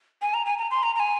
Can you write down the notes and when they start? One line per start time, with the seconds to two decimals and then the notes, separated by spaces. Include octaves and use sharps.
0.22 G#5
0.34 A#5
0.46 G#5
0.58 A#5
0.71 C6
0.83 A#5
0.96 A#5
1.00 G#5